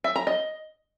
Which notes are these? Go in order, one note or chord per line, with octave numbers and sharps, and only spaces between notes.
E5
A#5
D#5